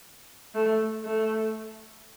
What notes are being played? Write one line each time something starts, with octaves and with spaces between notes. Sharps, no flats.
A3
A3